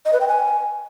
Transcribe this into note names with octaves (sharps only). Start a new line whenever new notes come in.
D#5
B4
G5
G#5